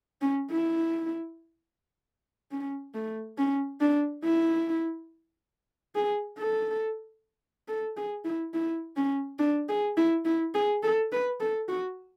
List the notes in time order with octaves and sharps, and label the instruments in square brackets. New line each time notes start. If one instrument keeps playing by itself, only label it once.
[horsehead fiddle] C#4
E4
C#4
A3
C#4
D4
E4
G#4
A4
A4
G#4
E4
E4
C#4
D4
G#4
E4
E4
G#4
A4
B4
A4
F#4